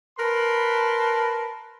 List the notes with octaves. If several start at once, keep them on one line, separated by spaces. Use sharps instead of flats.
A#4 B4 A5 B5 C6